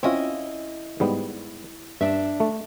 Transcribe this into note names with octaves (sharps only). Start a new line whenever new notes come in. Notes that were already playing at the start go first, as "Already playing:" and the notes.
C4 C#4 E4 F4 D#5
G#2 G3 B3
G2 D4 E5
A3